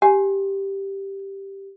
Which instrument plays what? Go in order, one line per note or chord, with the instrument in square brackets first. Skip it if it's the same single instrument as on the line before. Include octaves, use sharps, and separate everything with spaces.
[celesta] G4 [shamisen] G#5